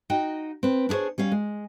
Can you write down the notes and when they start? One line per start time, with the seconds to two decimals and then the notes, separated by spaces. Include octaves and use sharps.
0.10 D#4 F#4 D#5 G5
0.63 C4 B4
0.89 D4 E4 G#4 C5 C#5
1.18 G3 C#4 F5
1.32 G#3